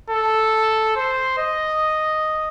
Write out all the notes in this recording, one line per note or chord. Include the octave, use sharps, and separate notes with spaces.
A4
C5
D#5